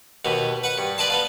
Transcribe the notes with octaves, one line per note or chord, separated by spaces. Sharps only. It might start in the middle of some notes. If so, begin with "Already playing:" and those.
D#2 B2 B3
B4 F#5 C#6
G2
B4 D5 D#5 A5 C6
B3 B4 F5